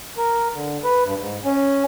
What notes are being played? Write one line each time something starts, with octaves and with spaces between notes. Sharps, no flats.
A#4
D3
B4
G2
G#2
C#4